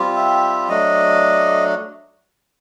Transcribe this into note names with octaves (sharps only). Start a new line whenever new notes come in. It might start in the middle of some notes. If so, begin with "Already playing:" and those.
Already playing: G3 C4 F4
E5
F#3 A3 D4 D#5